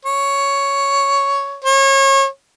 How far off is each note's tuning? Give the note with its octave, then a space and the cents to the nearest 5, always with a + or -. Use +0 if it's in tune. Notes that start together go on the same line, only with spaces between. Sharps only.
C#5 +5
C#5 -30